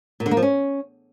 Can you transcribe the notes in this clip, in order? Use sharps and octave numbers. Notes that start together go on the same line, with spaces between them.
A#2
D3
A#3
F3
C#4